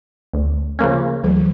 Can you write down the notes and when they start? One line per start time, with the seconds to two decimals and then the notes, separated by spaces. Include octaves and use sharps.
0.34 D2
0.79 C#3 F3 A#3 C#4
1.23 D2 E3 F#3